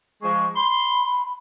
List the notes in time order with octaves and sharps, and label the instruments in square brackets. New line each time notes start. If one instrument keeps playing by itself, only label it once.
[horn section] F3 G#3 [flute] C#6
[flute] B5 [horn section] C6